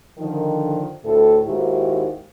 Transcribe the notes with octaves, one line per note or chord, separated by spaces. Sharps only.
D3 D#3 F3
D2 A2 A4
D#2 G#2 D#3 E4 F#4 G4